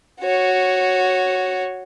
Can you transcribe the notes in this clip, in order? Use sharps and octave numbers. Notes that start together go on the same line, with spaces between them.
F#4 C#5